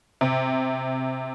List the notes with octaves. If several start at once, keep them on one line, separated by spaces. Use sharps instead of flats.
C3